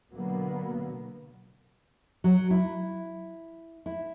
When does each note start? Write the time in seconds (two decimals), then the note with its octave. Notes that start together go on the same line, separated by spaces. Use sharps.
0.11 B2 D3 F#3 A#3 B3
2.24 F#3
2.51 E4
3.86 E4